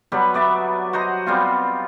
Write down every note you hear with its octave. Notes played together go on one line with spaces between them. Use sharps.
F#3 G3 B3 B4
B3 D5 E5
F#4 C5 D#5 A#5
G3 B3 C4 F4